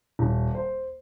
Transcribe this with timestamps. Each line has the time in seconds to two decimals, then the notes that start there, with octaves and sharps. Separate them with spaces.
0.19 D#1
0.55 C5